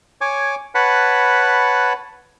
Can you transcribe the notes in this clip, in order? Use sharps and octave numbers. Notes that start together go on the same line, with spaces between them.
C#5 G#5 D6
B4 C#5 F#5 A5 B5